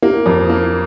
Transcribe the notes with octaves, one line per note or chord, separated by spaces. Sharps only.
A#3 G4 A#4
F2
A#3